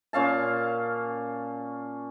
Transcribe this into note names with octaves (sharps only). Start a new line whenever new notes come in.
A#2 C#4 F5 A5